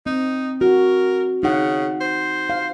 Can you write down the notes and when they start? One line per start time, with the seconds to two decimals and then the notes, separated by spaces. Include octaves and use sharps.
0.06 C4 D#4
0.61 F#4 A#4
1.43 C#3 D#4 F#5
2.01 C5
2.50 F5